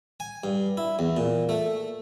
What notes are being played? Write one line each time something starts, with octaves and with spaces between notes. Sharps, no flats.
G#5
G2
E4
E2
A#2
A3